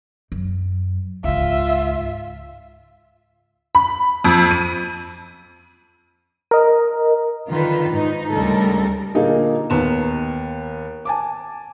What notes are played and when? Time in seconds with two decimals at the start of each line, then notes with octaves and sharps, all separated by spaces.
0.32 F#2
1.24 C#2 G#2 F4 E5
3.75 B5
4.24 F2
4.51 D#7
6.51 A#4 D#5
7.49 D3 D#3 F4 B4
7.89 G#2 D#4
8.30 D2 C#3 G3 G#3 A4 A#4
9.15 A#2 D3 A#3 D#4 G#4
9.70 D#2 B3 A#5 E7
11.05 G#5 A5 D6